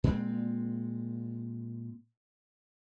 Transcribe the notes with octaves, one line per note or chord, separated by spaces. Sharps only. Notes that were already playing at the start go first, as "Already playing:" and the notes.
A#2 G#3 C4